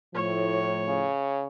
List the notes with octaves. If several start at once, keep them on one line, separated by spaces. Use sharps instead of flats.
A2 F3 C#5
C#3